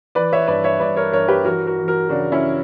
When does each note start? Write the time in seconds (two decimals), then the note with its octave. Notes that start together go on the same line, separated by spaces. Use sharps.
0.15 E3 B4 D5
0.33 C#5 E5
0.48 G2 B4 D5
0.64 C#5 E5
0.80 G2 B4 D5
0.96 A#4 C#5
1.13 G2 A#4 C#5
1.28 G4 B4
1.45 E3 F#4 A#4
1.67 F#4 A#4
1.78 E3
1.88 F#4 A#4
2.09 C#3 D4 F#4
2.32 C#4 E4